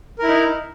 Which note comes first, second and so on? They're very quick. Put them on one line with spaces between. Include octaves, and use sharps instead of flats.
A#4 E4 D#4